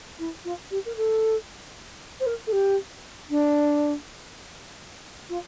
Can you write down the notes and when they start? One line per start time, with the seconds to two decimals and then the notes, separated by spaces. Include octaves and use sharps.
0.19 E4
0.45 F4
0.71 G4
0.85 A#4
0.96 A4
2.20 C5
2.26 A#4
2.47 A4
2.52 G4
3.30 D4
5.29 F4